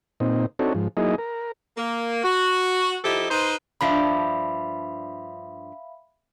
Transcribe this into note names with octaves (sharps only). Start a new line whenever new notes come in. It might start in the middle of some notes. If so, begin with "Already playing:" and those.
A#2 C4 D#4
C4 D4 D#4 F#4 A4 C#5
G#2 F3
F#3 A#3 D#4 E4 G#4 D#5
A#4
A#3
F#4
F3 D#4 E4 G4 A4
D#4 B4 C5
G2 F3 D4 E5 F5 B5